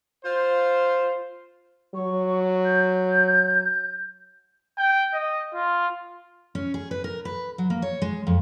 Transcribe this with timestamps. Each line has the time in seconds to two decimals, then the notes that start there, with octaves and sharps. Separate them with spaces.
0.24 F4 C5
1.94 F#3 C#6
2.64 G6
4.77 G5
5.13 D#5
5.54 F4
6.55 C#4
6.74 G#4
6.91 B4
7.04 A#4
7.25 B4
7.58 F#3
7.70 A#3
7.82 C#5
8.02 G#3
8.27 F2